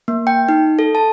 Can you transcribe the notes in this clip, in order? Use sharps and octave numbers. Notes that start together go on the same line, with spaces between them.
A#3
G5
D#4
A4
A5